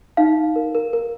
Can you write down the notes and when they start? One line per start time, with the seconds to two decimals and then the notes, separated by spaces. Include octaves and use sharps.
0.17 D#4 F5
0.37 D#4
0.56 A#4
0.75 A#4
0.93 A#4